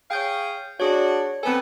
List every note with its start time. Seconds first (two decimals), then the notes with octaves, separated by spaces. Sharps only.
0.11 G#4 C#5 F5 G5 G6
0.80 D4 F#4 G#4 C#5
1.43 B3 C4 A4 G#5